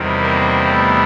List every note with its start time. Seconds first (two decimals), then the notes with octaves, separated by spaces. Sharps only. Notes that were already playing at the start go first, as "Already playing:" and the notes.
Already playing: E2 C3 D#3 G3
0.21 A#3 C4
0.69 A3 B3